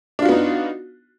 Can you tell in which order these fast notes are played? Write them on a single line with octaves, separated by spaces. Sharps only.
D4 F4 F#4 B3 D#4